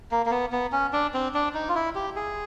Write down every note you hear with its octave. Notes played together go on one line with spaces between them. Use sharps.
A#3
A#3
B3
B3
C#4
D4
C4
D4
D#4
F4
E4
G4
G#4